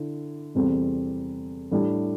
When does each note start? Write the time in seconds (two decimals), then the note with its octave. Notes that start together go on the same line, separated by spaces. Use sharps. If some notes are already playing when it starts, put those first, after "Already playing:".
Already playing: D3 E4
0.55 E2 C3 G3 C4 A4
1.71 A2 G3 D4 G4